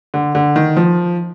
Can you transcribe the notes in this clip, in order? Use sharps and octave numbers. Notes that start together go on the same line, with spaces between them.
D3
D3
D#3
F3